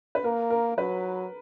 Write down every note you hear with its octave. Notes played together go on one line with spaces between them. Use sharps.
B4
A#3 A#4
A#4
F#3 B4